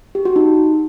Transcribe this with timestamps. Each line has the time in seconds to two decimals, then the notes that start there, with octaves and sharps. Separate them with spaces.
0.15 G4
0.25 F#4
0.36 D#4